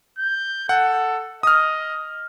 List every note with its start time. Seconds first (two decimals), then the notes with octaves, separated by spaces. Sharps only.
0.19 G6
0.69 A4 F#5
1.43 D#5 D#6 F6